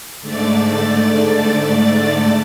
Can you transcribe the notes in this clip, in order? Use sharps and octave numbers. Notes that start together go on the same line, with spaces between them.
G#2 D3 A3 D5 A6